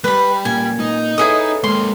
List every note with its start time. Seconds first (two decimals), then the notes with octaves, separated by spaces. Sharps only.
0.04 G3 B4 B5
0.45 A#2 C#3 A#3 G#5
0.80 D#4
1.18 E4 G#4 A4 B4 C#5 D#6
1.64 G#3 A#3 C6